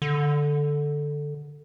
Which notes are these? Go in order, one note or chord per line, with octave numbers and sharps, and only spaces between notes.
D3